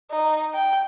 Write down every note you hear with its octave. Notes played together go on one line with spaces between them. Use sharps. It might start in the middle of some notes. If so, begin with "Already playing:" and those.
D#4
G5